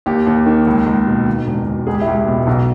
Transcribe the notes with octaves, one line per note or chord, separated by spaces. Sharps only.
D#2 G4
D#2
D#3
C#2
C#2
B2
D#3
E1
E1
C#2 G#4
G4
E4
C#2 G4
B2
B1